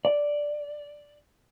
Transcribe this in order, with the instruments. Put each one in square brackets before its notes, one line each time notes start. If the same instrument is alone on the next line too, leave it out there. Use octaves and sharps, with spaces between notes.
[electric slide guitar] D5